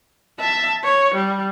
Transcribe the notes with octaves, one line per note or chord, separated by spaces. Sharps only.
E5 A5
C#5
G3